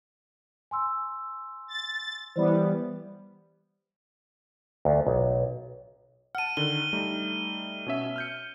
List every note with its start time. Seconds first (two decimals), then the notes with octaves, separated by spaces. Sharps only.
0.71 G#5 C6 E6
1.68 A6
2.36 E3 G3 B3 C5 D5 B5
4.85 D2
5.07 B1
6.35 F#5 A5 F6 D#7
6.57 D3 D#3 G7
6.93 G3 A3 D#4
7.86 B2 C#4 E5
8.16 F6 G6 C#7